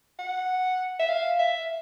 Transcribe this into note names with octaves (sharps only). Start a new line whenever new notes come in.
F#5
E5
F5
E5